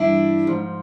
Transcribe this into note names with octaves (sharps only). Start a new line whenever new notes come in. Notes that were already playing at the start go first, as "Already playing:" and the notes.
Already playing: G2 E3 G3 D4 E4
G#2 F3